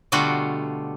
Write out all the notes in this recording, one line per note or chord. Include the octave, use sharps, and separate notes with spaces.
B2 D3 G3 A3 F4 F#4